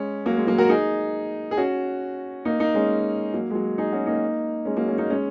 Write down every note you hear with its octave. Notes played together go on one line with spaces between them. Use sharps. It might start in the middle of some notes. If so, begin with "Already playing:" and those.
Already playing: G#3 C#4
F#3 A#3
G#3
F#3 A#3
F#4 A#4
D#4 G#4
G#4
C#4 F#4
A#3 D#4
A#3 D#4
G#3 C#4
F#3 A#3
G#3
F#3
D#4 G#4
C#4 F#4
A#3 D#4
G#3 C#4
F#3 A#3
G#3 C#4
A#3 D#4
G#3 C#4